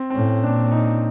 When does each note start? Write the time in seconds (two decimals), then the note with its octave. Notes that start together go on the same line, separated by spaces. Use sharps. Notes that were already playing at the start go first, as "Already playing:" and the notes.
Already playing: C4
0.10 C4
0.15 A2 C#4
0.43 A#2 D4
0.71 D#4